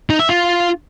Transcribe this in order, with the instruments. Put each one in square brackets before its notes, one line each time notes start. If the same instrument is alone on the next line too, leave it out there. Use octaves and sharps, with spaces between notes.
[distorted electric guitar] D#4
E5
F4